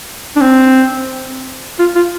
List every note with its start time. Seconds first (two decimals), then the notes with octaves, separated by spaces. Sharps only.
0.36 D4
0.42 C4
1.79 F4
1.95 F4